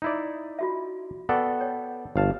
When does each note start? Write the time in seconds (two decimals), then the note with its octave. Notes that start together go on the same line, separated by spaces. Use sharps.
0.02 D#4 E4 D5
0.59 F4 F#4 E5
1.29 B3 A4 D5 F#5 G5 C#6
1.61 C#5 G5
2.16 G1 F5 A5